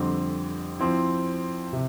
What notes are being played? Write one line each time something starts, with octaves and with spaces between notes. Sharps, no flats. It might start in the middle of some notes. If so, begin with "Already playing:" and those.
Already playing: F2 D3 G3 C4 G4
F3 C4 E4
C3